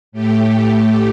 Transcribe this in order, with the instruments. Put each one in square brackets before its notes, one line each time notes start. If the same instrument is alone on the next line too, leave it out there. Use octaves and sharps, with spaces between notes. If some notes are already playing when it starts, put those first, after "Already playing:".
[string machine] A2 A3 G4